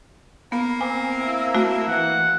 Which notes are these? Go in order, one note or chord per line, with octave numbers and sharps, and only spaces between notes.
A#3 B3
C4 G#5
E4
A3 F#4
E3 F#5